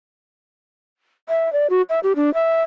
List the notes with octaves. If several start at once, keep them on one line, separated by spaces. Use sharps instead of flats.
E5
D5
F#4
E5
G4
D4
E5